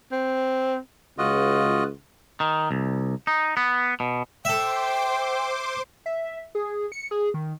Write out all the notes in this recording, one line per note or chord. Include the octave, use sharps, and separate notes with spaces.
C4
C#2 F4 F#4 D#5
D#3
C2
D#4
B3
B2
A4 C5 E5 G5 C6 D6
E5
G#4
C#7
G#4
D#3